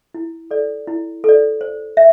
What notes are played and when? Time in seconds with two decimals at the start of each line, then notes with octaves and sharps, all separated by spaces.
0.14 E4
0.51 A4 D5
0.87 E4
1.24 A4 D5
1.61 C5
1.97 E5